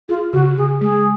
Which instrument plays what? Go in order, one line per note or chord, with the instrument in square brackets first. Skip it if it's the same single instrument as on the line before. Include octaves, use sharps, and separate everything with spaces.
[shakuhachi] F4 [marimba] G#4
[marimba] C#3 [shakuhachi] F#4
[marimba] C#3 [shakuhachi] G#4
[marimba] G#3 [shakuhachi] G#4